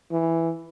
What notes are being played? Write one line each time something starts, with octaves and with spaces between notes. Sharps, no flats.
E3